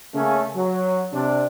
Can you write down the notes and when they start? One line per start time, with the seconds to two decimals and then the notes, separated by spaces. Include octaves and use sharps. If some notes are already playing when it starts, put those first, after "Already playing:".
0.14 C#3 A3 A#3 C#4
0.55 F#3
1.13 C3 D4